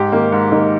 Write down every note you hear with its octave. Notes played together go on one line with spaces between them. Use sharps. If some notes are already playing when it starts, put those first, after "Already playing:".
Already playing: G#2 G4
D#3 A#3
G#2
D#3 A#3